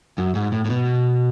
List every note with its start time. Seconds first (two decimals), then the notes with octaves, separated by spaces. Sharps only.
0.18 F#2
0.35 G#2
0.52 A2
0.65 A2
0.70 B2